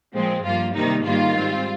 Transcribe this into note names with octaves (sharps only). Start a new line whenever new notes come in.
A#2 F3 G#3 C4
G2 F3 A#3 F4
C3 D#3 G3 A#3 D#4
G#2 D#3 G3 A#3 F4
G#2 G3 C4